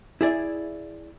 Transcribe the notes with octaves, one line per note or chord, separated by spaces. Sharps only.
E4 G#4 D5 E5